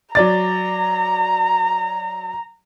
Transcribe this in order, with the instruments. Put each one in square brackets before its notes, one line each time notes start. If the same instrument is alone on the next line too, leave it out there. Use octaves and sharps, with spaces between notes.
[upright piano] F#3 D5 A6 [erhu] A#5